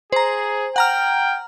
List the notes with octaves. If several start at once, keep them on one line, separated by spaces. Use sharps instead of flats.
G#4 C5 A#5
F#5 G5 A#5 F6